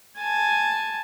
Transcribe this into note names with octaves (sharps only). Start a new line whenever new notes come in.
G#5 A5